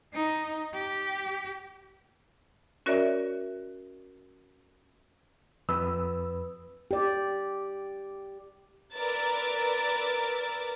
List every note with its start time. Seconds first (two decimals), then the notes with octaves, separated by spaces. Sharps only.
0.14 D#4
0.74 G4
2.86 C#4 F#4 A#4 C#5 D5 E5
5.69 F2 B4 D#6 E6
6.91 G4 D5
8.95 A#4 B4 D5 E6 A6